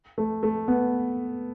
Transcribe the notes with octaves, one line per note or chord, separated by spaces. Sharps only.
A3
A3
B3